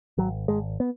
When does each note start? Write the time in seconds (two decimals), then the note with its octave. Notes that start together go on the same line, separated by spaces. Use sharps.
0.18 G#1 F#3
0.48 G#1 G#3
0.80 B3